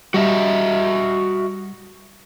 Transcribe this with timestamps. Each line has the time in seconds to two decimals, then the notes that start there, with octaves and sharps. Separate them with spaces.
0.14 G3 F#4 D#5 E5